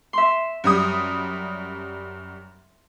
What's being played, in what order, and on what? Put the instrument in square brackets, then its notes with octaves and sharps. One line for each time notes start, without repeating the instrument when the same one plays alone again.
[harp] E5 C6
[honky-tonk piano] F#2 G3 D#6